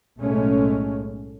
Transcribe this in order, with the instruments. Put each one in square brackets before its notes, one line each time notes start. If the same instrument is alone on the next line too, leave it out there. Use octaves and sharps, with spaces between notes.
[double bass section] B1 A2 G#3 A3 C#4